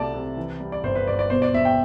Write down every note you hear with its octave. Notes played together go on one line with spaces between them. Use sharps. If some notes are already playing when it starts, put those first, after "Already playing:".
Already playing: C2 F#3 A3 D5 A5
C3
E3
G3
D5
G1 C5
B4
G2 D5
D5
B2 C5
D5
E1 E5
G5